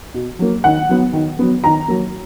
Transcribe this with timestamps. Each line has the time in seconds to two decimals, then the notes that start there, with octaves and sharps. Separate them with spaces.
0.14 B2
0.39 F#3 A#3
0.64 D#3 F#5
0.89 F#3 B3
1.13 D#3
1.39 F#3 B3
1.64 D#3 A#5
1.88 F#3 A#3